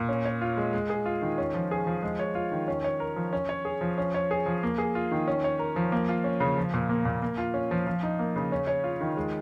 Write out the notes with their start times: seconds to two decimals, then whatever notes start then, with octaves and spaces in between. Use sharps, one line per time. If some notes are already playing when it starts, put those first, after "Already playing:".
Already playing: A#2
0.09 C#4
0.25 C#5
0.41 F4
0.57 G#3
0.73 G#3
0.90 G#4
1.06 F4
1.22 D#3
1.38 C#4
1.54 F3
1.71 G#4
1.87 F3
2.03 G#3
2.19 C#5
2.35 F4
2.52 D#3
2.68 C#4
2.84 C#5
3.00 A#4
3.16 F3
3.33 C#4
3.49 C#5
3.65 G#4
3.81 F3
3.98 C#4
4.14 C#5
4.31 G#4
4.46 F3
4.63 A#3
4.78 G#4
4.95 F4
5.12 D#3
5.28 C#4
5.44 C#5
5.59 A#4
5.76 F3
5.92 A#3
6.09 F4
6.24 C#4
6.40 C#3
6.58 F3
6.74 A#2
6.89 A#3
7.05 A#2
7.22 A#3
7.38 F4
7.54 C#4
7.71 F3
7.87 F3
8.03 D#4
8.19 A#3
8.36 C#3
8.52 C#4
8.67 C#5
8.84 F4
9.01 D#3
9.17 G#3